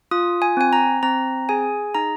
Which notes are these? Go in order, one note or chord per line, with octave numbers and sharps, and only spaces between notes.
F4 D#6
G#5
C4 G#5
A#5
C4 A#5
G#4 G#5
D#4 A#5